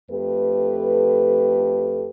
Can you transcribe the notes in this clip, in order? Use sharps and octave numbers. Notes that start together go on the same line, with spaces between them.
F2 A3 G4 A4 B4